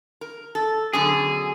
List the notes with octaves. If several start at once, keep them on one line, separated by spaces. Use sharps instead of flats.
A#4
A4
F#2 B2 D3 G#4